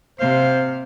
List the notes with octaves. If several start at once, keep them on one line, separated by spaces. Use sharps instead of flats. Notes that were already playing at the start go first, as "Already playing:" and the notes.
C3 C5 F5